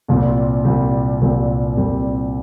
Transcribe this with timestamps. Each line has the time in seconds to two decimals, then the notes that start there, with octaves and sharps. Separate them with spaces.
0.08 C2 A#2 G3 C4
0.65 C2 A#2 G3 C4
1.21 C2 A#2 G3 C4
1.77 C2 A#2 G3 C4